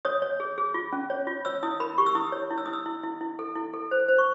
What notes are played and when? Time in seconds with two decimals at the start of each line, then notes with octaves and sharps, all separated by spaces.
0.05 C#5 D#6
0.22 C#5
0.40 G#4
0.58 G#4
0.74 F4
0.93 C#4
1.10 C#5
1.27 F4
1.45 C#5 E6
1.63 E4 D#6
1.80 A#4 B5
1.98 G4 C#6
2.06 E6
2.15 E4 D#6
2.32 C#5
2.51 E4
2.58 E6
2.66 E4 D#6
2.73 E6
2.86 E4
3.03 E4
3.21 E4
3.39 A4
3.55 E4
3.73 A4
3.91 C5
4.08 C5
4.18 C#6